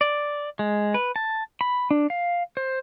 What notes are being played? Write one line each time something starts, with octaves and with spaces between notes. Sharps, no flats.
D5
G#3
B4
A5
B5
D4
F5
C5